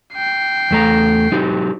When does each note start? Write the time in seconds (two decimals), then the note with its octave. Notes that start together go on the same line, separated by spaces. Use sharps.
0.14 G5 C7
0.71 E2 A3 A#5
1.32 F#3 D#4 G4